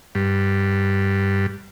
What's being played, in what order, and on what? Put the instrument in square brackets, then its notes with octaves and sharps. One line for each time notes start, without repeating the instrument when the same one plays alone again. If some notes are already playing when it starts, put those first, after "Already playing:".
[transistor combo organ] G2